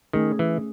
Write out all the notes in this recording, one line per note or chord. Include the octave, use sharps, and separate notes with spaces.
D#3 A3 C#4 G#4
E3